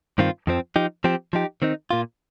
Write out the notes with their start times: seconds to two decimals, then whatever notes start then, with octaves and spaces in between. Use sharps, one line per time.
0.18 G2 D#3 C4 F4
0.47 F2 F3 C4
0.76 F3 D#4 G4
1.04 F3 C4 G4
1.33 F3 D#4 G4
1.62 D#3 C4 D#4
1.91 A#2 A#3 F4